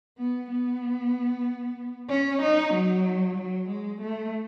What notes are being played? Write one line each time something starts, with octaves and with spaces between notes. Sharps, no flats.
B3
B3
C#4
D#4
F#3
F#3
G#3
A3